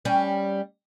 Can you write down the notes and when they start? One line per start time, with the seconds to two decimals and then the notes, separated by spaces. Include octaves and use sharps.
0.05 G3 C#4